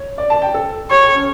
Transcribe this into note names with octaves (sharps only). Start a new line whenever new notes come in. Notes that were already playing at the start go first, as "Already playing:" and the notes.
Already playing: C#5
D5
A5
G5
A4
G4 C#5
A4
C#4